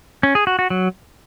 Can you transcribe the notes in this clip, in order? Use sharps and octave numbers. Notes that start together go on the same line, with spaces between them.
C#4
G#4
F#4
F#4
F#3